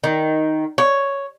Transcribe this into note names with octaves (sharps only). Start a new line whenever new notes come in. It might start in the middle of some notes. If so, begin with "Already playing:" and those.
D#3
C#5